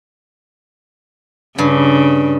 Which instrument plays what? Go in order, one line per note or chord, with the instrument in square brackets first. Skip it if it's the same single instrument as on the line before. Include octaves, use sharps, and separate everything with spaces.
[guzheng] G2 [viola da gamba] C#3